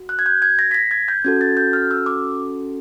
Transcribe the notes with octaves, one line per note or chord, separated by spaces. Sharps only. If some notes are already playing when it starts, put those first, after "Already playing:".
Already playing: F#4
F#6
G#6
G6
G#6
A#6
B6
A#6
G#6
G6
C#4 F#4 A4 G#6
A6
G6
F6
E6
D6